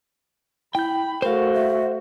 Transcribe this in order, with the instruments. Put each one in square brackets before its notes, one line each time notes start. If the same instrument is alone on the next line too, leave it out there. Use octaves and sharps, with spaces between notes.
[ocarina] E4 [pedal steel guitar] G5 G6 [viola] B5
[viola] A3 F#4 [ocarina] A#4 [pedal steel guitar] C5 F5
[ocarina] E5